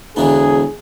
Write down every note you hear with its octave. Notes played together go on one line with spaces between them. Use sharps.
E1 D3 E3 B3 G#4